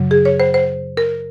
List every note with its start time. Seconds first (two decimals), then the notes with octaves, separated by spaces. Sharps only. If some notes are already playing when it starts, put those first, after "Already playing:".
Already playing: F#2 C#3 F#3
0.11 G#4
0.25 C#5
0.40 C5
0.54 C5
0.97 A#4